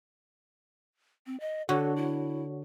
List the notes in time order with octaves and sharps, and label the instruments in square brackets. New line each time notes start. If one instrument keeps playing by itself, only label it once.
[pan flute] C4
D#5
[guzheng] D3 [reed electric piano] F#4 C#5 [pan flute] A4
[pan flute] E4